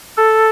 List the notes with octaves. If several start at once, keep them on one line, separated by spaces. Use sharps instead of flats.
A4